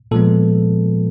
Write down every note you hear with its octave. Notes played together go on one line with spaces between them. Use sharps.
A#2 F3 G#3 B3 A4